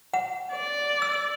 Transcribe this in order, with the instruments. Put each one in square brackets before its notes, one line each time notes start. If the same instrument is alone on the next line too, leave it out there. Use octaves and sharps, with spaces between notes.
[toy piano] F#5
[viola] D5
[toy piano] E6